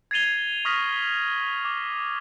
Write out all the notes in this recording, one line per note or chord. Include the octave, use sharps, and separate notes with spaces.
G#6 A6 C7 D#7 F7 G7
C#6 D#6 F6 A#6 B6 F#7
D6